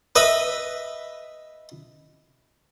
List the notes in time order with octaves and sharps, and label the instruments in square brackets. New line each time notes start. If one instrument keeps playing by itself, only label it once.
[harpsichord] B4 D#5 E5 B5